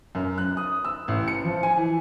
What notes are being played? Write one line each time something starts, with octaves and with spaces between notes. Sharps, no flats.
F#2
F#6
D#6
E6
A1
C#7
F3
G#5
E3